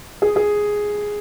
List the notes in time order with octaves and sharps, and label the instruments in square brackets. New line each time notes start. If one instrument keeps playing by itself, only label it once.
[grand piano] G#4
G#4